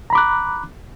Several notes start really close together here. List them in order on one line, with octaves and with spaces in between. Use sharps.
A#5 B5 D6 F#6